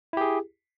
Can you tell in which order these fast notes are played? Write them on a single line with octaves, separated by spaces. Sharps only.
E4 G4 G#4